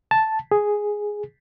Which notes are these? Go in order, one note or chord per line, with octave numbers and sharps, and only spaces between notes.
A5
G#4